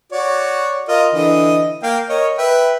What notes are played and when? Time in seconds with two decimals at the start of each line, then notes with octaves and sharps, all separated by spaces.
0.12 F#4 C#5 D5
0.88 F4 A#4 D#5
1.13 D3 E3 D#5
1.83 A#3 F5 G5
2.09 A#4 C#5 D#5
2.38 B4 E5 G5